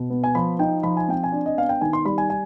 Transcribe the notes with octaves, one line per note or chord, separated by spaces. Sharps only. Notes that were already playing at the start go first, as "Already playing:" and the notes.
Already playing: B2
B3
G#5
F3 B5
D#4 G5
F3 B5
G#5
C4 G5
G#5
D4
D#5
B3 F5
G5
D#3 G#5
C6
G3 B5
G#5
G#5